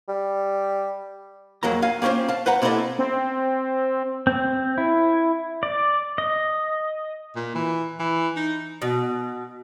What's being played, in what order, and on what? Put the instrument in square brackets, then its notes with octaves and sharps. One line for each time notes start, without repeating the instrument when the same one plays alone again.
[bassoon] G3
[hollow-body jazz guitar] F2 F#3 G#3 A#3 A#5
F5 G#5
A#3 C4 C#4 F4 C5
F5 A5
B4 C5 F#5 A#5
A#3 C4 E4 G4 A4 D#5
[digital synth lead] C4
[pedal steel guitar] C4
E4
D5
D#5
[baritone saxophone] A#2
E3
E3
D#4
[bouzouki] B2